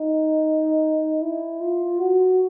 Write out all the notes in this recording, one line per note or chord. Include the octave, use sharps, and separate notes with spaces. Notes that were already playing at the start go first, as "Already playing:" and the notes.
Already playing: D#4
E4
F4
F#4